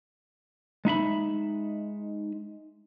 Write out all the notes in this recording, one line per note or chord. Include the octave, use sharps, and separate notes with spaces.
G#3 D#4 E5 B5